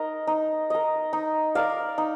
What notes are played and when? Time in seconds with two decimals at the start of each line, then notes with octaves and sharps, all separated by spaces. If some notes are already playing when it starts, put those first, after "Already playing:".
Already playing: D#4 A#4 D#5
0.27 D#4
0.70 A#4 D#5
1.13 D#4
1.55 A#4 D5 F5
1.98 D#4